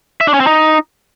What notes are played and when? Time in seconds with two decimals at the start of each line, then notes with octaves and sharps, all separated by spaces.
0.21 E5
0.27 D4
0.34 C#4
0.40 C4
0.47 D#4